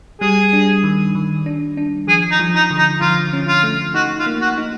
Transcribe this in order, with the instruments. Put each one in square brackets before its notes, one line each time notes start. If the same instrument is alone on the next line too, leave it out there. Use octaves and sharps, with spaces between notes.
[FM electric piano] G3 [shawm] G#4
[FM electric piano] D4
D#3
D#3
D4
D4
[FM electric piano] F3 [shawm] G#4
[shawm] D#4
[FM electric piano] F3
[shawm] D#4
[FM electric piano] D3
[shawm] D#4
[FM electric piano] F3 [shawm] F4
[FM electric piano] C#4
[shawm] F4
[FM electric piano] A3
[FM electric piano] D#4 [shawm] F#4
[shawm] F4
[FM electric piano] A#3
[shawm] F#4
[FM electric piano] D#4